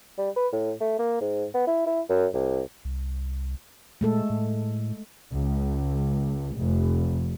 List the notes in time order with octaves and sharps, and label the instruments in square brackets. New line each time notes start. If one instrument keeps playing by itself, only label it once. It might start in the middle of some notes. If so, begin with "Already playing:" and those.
[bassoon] G3
B4
A2
A3
A#3
G#2
B3
E4
E4
F#2
C2
[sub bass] C2
[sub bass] A#2 [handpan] G#3 A3 A4
[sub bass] A2
[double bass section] C#2
F1